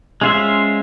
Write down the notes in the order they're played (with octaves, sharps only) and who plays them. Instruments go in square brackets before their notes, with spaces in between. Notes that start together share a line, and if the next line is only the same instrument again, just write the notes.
[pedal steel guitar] G#3 C#4 F4 C5 E5